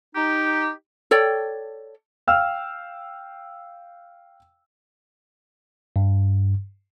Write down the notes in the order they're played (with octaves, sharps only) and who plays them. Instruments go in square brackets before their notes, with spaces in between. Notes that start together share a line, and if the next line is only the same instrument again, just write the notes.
[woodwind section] D#4 G4
[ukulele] A4 C#5 D5 G5
[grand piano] F5 G5 E6 F6
[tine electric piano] G2